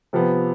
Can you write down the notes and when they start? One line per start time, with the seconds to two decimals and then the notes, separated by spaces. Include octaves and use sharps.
0.13 C3 F3 B3